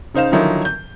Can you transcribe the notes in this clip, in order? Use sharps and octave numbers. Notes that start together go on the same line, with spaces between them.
C#3 D#4 C5 F5 E7
D3 D#3 F3 F#3 D#4 E4
G6